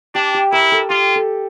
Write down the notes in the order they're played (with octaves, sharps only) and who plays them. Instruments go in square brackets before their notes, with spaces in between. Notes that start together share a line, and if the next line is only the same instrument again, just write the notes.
[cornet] D4 [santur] G4
[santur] G4
[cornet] E4 [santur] A#4
[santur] A4
[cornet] F4 [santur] G4
[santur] A4